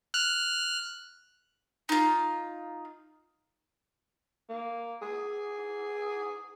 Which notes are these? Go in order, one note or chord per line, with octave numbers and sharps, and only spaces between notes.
F6 F#6
D#4 F4
A#3
G#4